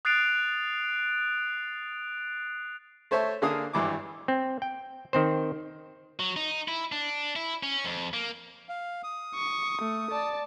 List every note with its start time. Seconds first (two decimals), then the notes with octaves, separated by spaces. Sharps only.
0.05 D#6 F#6 A6 C7 D7 F7
3.11 A3 C5 C#5 E5 A5
3.42 D3 A#3 D4 G#4 F5 D#6
3.73 G#1 G2 E3 D6
4.28 C4
4.62 G5
5.13 D#3 C4 C5
6.20 F#3
6.36 D#4
6.68 E4
6.92 D4
7.36 E4
7.63 C#4
7.85 F2
8.14 A#3
8.69 F5
9.04 D#6
9.35 C#6
9.82 A3
10.11 D5 A5